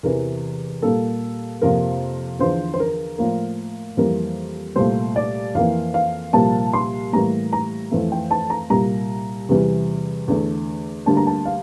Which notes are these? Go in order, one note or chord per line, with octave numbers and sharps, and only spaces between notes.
E2 C3 E3 A#4
A#2 G3 A#3 A4
F2 C3 F3 A#3 A#4
E2 D3 F3 C5
C5
A#4
A2 F3 A#3
F2 E3 G3 A#3 A#4
C2 A#2 A3 C5
D5
F2 E3 A#3 F5
F5
C2 A#2 F3 A#3 A5
C6
A2 E3 G3 A#3 A#5
A#5
F2 E3 A3
G5
A5
A#5
C2 A#2 G3 A#3 A#5
E2 C3 E3 G3
E2 D3 A3
D2 D3 G3 A#3 A5
A#5
A5
F5